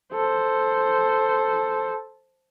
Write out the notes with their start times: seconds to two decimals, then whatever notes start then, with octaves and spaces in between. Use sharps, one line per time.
0.13 A4 C5